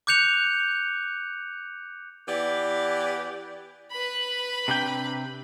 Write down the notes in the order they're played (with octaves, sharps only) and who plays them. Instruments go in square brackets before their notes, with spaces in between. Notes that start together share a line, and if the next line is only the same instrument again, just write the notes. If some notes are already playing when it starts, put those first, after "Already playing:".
[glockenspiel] D6 F#6 G6 C#7 F7
[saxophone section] E3 B3 G4 D5
[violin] B4 B5
[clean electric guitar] C3 D4 G5